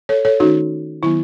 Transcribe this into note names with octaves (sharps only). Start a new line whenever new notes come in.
A4 C#5
A4 C#5
D#3 A3 C#4 D#4 F#4
D#3 F#3 B3 E4